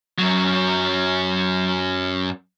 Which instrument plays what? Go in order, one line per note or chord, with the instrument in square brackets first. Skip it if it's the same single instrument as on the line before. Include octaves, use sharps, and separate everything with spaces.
[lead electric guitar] F#2 F#3